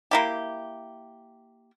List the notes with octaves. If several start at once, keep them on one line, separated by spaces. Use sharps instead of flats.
A#3 E4 G4